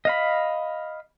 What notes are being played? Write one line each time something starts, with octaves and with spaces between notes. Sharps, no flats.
D#5 F5 B5